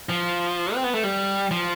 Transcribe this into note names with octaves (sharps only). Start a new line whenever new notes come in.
F3
C4
B3
A3
G3
F3